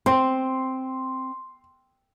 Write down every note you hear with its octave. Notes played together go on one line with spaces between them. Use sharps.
C4 C6